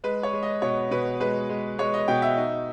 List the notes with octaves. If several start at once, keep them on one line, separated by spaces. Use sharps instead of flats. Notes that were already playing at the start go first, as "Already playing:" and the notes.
G#3 B4
C#5
G#3
D#5
B2 C#5
B2 B4
G#3 B4
G#3
G#3 C#5
D#5
B2 G5
E5
D#4